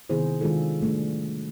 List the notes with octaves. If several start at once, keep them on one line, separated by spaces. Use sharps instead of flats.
C3 D#3 B3 E4 G#4 C5
D#3 G#3 D4 F4 G#4 A4
G3 A3 D4